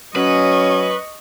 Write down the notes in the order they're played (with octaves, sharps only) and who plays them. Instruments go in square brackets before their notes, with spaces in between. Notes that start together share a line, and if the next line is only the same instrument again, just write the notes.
[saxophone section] F#3 C#4 [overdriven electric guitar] B4 [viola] D#5 C#6